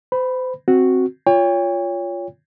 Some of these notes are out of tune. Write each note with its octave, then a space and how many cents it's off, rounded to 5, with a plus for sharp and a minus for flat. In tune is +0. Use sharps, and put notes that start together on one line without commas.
C5 -35 B5 +0
C4 +0 F#4 +0
F4 +0 C#5 +20 G5 +40